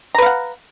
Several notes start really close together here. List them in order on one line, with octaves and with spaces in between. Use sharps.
A#5 B4 F5 F#5